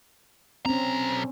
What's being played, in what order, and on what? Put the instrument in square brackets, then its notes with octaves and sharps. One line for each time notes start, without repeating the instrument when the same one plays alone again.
[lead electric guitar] B1 A#5 [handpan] C4 C#4